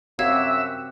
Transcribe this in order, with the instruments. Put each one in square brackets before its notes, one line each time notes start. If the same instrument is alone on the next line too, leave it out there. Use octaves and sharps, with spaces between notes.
[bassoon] F#2 [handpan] C4 F#4 G4 [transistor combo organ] E5 [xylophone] F5 E6 G#6